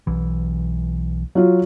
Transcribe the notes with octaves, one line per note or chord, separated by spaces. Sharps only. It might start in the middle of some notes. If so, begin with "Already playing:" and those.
B1 E3
F#3 F4